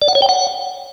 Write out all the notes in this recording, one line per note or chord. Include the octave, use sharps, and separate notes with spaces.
D5
F#5
C#5
G5
F#5